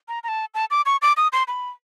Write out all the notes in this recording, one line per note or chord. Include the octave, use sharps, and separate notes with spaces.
A#5
A#5
A5
A5
D6
C#6
D6
D#6
C6
B5